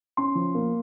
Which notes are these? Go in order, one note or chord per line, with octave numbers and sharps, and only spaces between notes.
C#4 C6
F3
A#3